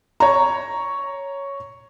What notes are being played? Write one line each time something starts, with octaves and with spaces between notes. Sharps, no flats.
C#5 A#5